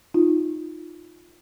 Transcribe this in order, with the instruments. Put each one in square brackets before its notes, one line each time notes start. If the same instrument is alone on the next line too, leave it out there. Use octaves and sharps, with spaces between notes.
[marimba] D#4 F4